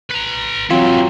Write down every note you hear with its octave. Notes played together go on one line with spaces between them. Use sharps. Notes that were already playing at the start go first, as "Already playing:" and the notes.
B4 A#5
E3 F#3 A#3 C4 F4